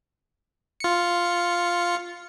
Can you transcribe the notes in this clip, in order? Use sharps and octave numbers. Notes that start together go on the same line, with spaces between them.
F4 C#7